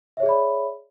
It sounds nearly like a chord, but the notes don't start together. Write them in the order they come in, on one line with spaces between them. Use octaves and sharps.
E5 C#5 G#4 D5 B5